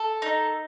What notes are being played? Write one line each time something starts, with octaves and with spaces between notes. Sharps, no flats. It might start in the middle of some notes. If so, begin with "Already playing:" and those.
Already playing: A4
D#4